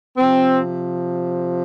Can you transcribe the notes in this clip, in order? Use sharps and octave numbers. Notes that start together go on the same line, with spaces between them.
C3 F3 C4